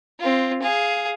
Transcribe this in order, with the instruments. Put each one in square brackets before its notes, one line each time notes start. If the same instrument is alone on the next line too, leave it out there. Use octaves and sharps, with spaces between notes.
[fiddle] C4 F4
G#4 F5